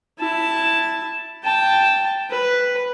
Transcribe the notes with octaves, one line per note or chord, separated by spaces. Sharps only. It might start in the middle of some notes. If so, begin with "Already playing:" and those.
E4 A5
G5 A5
B4